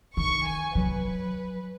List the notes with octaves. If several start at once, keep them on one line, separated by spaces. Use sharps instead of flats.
D#3 C#6
G#5
F#3 B4